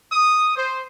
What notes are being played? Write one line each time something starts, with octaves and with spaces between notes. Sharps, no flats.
D#6
C5